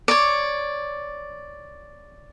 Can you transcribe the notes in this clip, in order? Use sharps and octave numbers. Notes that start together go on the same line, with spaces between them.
C#5 D5